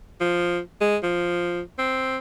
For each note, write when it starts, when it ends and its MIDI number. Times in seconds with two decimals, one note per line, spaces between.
0.21 0.60 53
0.81 0.97 56
1.03 1.61 53
1.79 2.17 60